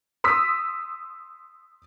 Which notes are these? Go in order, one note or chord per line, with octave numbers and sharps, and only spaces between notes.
C6 D#6 E6 B6